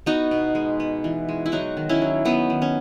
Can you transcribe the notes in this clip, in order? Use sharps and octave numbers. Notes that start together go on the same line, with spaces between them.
B3 D#4 F#4
B2
G#3
B3
E3
G#3
E4
F#3 D#4 F#4
D#3
C#4 E4
F#3
F#3 B3 D#4
D#3
C#4